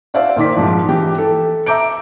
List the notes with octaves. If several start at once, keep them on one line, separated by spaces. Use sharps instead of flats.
F#4 C5 D5 E5 F5
A#2 D#3 D6 B6
G#2 F3
E3 G4
A4
E5 A#5 D6 G6 D7